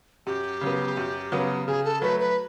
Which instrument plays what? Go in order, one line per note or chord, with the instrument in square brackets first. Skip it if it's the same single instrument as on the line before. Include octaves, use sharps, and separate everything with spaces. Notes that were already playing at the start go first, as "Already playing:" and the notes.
[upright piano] F#2 [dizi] G4
[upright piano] C#3 F#3 B3
F#2
C#3 F#3 B3
[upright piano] C#3 [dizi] G#4
[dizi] A4
[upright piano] F#3 A3 [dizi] B4
[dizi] B4